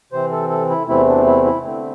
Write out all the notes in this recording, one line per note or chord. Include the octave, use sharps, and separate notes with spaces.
C3 E3 C4 C5
A4
A4
E4
E2 C3 E3 A3 C4 E4
D4
E4
E4
D3 A3 C4